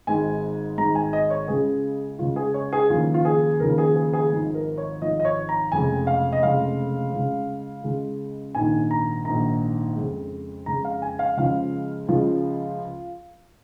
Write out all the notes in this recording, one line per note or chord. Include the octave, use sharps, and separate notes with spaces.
G#1 G#2 G#3 G#5
G#1 G#2 G#3 A#5
G#5
D#5
C#5
C#2 C#3 G#3 G#4
C#2 C#3 G#3 F4
G#4
C#5
G#4
D#2 C#3 F3 F4
F4
G#4
D#2 C#3 F3 A#4
G#4
G#4
G#4
G#1 G#2 F3
A#4
C#5
G#1 G#2 F3 D#5
D#5
C#5
A#5
F1 F2 C#3 G#3 G#5
F5
D#5
F1 F2 C#3 G#3 F5
C#2 C#3 G#3
C#2 C#3 G#3
A#1 G#2 D#3 G#5
A#5
A#1 G#2 D#3 A#5
F2 C#3 G#3
F2 C#3 G#3 A#5
F5
G#5
F5
C#2 C#3 F3 G#3 F5
C#2 C#3 F3 G#3 F4